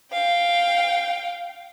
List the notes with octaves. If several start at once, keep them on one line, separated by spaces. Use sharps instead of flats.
F5 G5